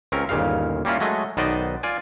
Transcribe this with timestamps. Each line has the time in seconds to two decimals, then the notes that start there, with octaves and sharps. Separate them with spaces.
0.12 C#2 C4 C#4 A#4
0.29 G1 D#2 A#2 C#3 F5
0.85 G3 A#3 C#4 E4 F4
1.00 F#3 G#3 A3 D#5
1.37 B1 D#3 B3 C5 D5 D#5
1.83 F4 D5 G#5